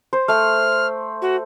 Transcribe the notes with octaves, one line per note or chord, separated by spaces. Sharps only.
C5
A3 F6
F#4